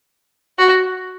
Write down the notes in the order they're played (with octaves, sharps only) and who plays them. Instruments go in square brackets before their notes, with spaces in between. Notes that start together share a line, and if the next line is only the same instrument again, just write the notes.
[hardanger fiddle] F#4